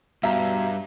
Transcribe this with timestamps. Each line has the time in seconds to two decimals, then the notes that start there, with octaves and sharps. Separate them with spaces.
0.23 G2 B2 E5 F5 A#5